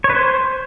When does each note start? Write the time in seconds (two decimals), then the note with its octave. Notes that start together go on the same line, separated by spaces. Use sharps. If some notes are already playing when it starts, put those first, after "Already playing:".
0.04 C#5
0.10 B4
0.15 C5